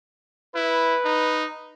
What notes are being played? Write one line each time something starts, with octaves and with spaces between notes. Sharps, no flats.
E4 B4
D#4